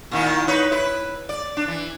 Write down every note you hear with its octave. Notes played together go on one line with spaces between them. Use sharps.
A#2 D#3 E4
D#4 B4 C#5
E4 B4
D5
D4
E3